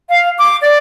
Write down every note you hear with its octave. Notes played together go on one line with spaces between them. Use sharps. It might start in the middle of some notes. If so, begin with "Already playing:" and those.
F5
D6
D5